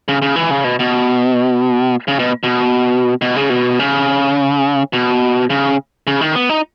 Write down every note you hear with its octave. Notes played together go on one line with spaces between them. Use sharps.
C#3
C#3
E3
C#3
B2
B2
C#3
B2
B2
B2
C#3
B2
C#3
B2
C#3
C#3
D#3
B3
D#4